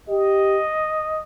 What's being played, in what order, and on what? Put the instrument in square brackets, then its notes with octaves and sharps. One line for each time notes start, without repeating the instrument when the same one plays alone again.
[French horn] G4 [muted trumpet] D#5